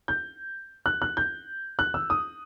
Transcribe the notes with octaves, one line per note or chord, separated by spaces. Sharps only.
G6
F#6
F#6
G6
F#6
E6
D#6